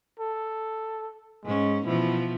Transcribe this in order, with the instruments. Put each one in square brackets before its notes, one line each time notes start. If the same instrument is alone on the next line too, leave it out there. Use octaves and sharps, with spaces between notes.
[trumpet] A4
[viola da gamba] G#2 C#4 [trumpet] G#3
[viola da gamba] B2 E3 F3 [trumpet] E4